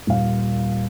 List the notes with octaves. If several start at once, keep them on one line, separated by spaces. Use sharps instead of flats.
D#1 F5